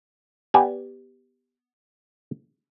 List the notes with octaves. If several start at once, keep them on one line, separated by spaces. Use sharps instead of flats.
B3 G4 D5 G#5